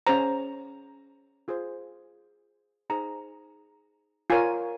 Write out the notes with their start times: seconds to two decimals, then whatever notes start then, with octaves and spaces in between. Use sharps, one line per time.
0.07 C#4 G#4 C5 A#5
1.48 F4 G#4 C5
2.90 D#4 G#4 C5 A#5
4.30 F4 A#4 C#5 G#5